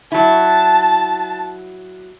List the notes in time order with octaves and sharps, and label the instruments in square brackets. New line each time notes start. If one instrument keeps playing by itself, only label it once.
[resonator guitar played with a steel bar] F#3 E4 [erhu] A5